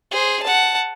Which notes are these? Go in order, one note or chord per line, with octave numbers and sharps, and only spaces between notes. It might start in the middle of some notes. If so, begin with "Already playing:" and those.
G#4 C5
F#5 A5